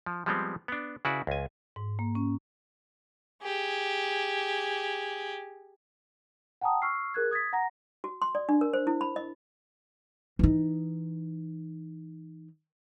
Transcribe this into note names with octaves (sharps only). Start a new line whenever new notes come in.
F3
F3 G3 G#3 B3 C4
B3 D4
C#3 E4 F#4 B4 D5
C#2 G#5
G#2
A#3
C#4
G4 G#4
F#5 G5 A5 A#5 D#6
C#6 E6 F6 C7
G#4 A#4 F#6 G#6
D#6 G#6 A6 B6
F#5 A#5 A#6
F#4
C6
D5
D4
A#4
C5
E4
B5
D#5
E3 D#4